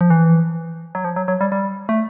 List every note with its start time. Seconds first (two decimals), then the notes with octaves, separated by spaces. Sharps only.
0.01 F3
0.10 E3
0.95 F#3
1.04 F3
1.16 F#3
1.28 F#3
1.41 G3
1.52 G3
1.89 A3